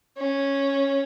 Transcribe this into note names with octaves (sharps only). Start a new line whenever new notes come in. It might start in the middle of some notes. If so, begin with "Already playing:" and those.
C#4